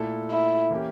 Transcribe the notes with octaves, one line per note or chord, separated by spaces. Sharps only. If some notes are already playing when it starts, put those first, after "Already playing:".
Already playing: A#2 A3 E4 A4
E4
E3 A#3 C#4 G4